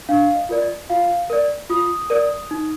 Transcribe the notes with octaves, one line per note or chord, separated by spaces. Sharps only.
D4 F5
D#5
F4 A#4 D5
D#5
F4 F5
A#4 D5
F4 D#6
A#4 D5
D#4